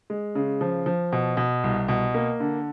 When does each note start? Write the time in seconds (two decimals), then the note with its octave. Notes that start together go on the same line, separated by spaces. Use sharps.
0.10 G#3
0.35 C#3
0.61 F3
0.86 F3
1.13 B2
1.37 B2
1.64 C2
1.88 B2
2.14 A#3
2.40 D3